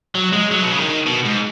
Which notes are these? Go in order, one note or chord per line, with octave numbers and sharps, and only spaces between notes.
F#3
G#3
F#3
B2
C#3
D#3
B2
G#2